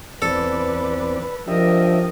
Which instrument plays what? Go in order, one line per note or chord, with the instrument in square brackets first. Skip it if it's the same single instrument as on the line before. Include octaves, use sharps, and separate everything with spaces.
[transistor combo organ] E2 C4 D5 [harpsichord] A4 [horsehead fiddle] B4
[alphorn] F3 [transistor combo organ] D4 G4 E5 [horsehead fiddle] A#4 D#5